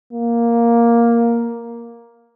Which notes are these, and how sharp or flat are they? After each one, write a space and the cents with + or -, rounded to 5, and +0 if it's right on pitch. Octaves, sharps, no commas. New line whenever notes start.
A#3 +5